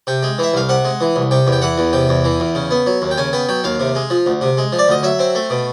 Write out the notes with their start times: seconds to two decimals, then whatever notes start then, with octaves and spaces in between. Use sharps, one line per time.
0.07 C3 G5
0.23 G#3
0.38 E3 E5
0.54 C2 F5
0.69 C3 F#5
0.85 G#3
1.01 E3
1.16 C2
1.31 C3 G5
1.47 E2
1.52 G5
1.62 E3 F#5
1.78 E2
1.93 C3 G5
2.09 E2
2.25 E3
2.40 E2
2.55 C#3
2.71 B3
2.86 F#3
3.02 D#2
3.11 G5
3.18 C#3 G#5
3.33 B3 G5
3.49 F#3 G5
3.64 D#2 F5
3.80 C3
3.95 G#3
4.10 F3
4.26 D2
4.41 C3
4.57 G#3
4.72 F3
4.79 D5
4.88 D2 D#5
5.03 F#3 E5
5.19 C4
5.35 A3
5.50 B2